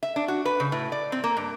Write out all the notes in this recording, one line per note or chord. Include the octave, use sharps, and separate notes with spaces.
E5
D4
F#4
B4
C#3
A2
D5
C4
A#3
G2